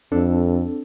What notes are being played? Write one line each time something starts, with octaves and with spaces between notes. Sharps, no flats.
F2 C4 D4 A4